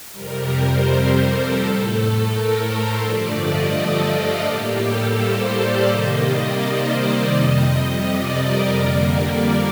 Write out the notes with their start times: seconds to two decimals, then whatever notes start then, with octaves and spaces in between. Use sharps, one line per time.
0.13 F2 C3 G3 A#4
0.50 C5
0.85 A#4
1.20 A4
1.57 A2 A3
1.93 A4
2.29 A#4
2.65 C5
3.00 G2 D3 F3 A3 D5
3.36 D#5
3.72 A4
4.07 F4
4.44 A2 G3 A#3 G4
4.79 A4
5.16 C5
5.51 D5
5.87 C3 D#3 G3 A#3 D#5
6.23 D5
6.60 C5
6.95 D5
7.31 F2 C3 G3 D#5
8.02 D5
8.38 A#4
8.74 F2 D3 G3 A#3 A#4
9.10 D5